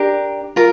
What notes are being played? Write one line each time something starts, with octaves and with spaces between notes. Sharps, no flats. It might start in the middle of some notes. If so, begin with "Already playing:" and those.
Already playing: D4 G4 A#4
F4 A#4